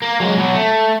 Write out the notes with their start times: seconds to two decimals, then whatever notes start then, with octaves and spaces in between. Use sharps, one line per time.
0.02 A#3
0.20 F#3 G#3
0.37 B2 F#3
0.54 A3